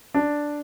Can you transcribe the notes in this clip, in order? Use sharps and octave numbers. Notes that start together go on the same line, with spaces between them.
D4